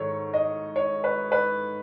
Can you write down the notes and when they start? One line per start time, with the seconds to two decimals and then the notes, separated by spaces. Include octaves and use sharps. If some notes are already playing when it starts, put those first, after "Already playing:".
Already playing: G#2 D#3 A4 C#5
0.34 D#5
0.76 C#5
1.04 B4
1.32 B4